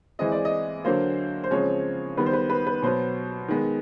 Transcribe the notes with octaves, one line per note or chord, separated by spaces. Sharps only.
E3 G#3 C4 D#5
D5
D#5
D3 F#3 A#3 C5
C5
C#3 F3 G#3 C4 C#5
D#3 G3 B3 B4
C5
B4
B4
B4
B2 F#3 B3 C5
D#3 G#3 B3